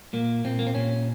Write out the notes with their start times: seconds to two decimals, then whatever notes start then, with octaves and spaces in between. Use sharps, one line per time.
0.13 A#2 A#3
0.45 A#2 C4
0.59 A#3
0.67 C4
0.75 A#2 C#4